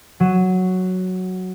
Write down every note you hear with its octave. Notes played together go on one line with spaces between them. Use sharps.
F#3 D#7 E7